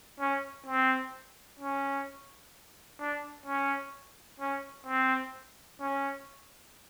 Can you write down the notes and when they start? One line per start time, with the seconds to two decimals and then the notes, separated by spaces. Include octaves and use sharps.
0.20 C#4
0.66 C4
1.59 C#4
2.99 D4
3.46 C#4
4.40 C#4
4.86 C4
5.80 C#4